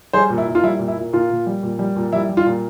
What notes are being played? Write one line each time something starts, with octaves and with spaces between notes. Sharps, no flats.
G3 G#4 C5
A#2
E4
A#2
F4
G3 E4
A#2
E4
A#2
A#2 F4
A#2
G3
A#2
G3
A#2
G3 E4
G3
F4
A#2